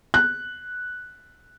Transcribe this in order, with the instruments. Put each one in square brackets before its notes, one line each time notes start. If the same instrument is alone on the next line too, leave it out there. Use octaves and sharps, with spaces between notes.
[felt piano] F#6